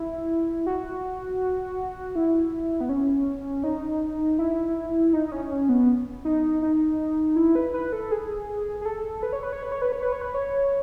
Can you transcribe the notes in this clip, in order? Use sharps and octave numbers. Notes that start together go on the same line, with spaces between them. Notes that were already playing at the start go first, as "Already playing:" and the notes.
Already playing: E4
F#4
E4
B3
C#4
D#4
E4
D#4
D#4
C#4
C#4
B3
D#4
D#4
E4
B4
B4
A4
G#4
G#4
A4
B4
C#5
B4
C#5
B4
C#5
B4
C#5
B4
C#5
B4
C#5